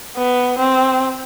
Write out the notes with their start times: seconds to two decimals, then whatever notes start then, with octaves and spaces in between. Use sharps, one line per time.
0.17 B3
0.59 C4